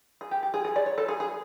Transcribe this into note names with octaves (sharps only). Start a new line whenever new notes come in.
G#4
G4
G4
G#4
G#4
D5
C#5
A4
G#4
G#4